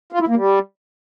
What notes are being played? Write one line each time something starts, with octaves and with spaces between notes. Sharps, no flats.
F4
E4
A#3
G3